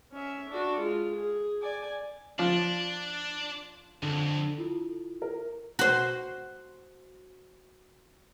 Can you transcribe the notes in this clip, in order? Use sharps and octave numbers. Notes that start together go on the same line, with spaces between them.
C#4 E5
D4 F#4
G#3 F4
G#4
D5 G#5
F3 D4
B1 F2 D3
E4 F4 A4
A#4
F#4 C5